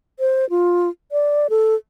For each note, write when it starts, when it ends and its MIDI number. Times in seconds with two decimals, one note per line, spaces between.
0.20 0.48 72
0.50 0.89 65
1.12 1.47 74
1.50 1.75 69